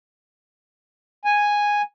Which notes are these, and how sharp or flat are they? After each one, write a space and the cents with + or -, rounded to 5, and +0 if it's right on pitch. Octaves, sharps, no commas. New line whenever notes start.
G#5 -5